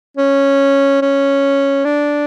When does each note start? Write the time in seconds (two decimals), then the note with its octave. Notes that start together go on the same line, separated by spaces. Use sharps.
0.17 C#4
1.02 C#4
1.85 D4